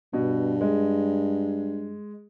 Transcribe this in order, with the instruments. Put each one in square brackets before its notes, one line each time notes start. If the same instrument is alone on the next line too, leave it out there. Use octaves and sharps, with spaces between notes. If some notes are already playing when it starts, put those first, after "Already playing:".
[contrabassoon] G2 [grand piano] B2
[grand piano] G#3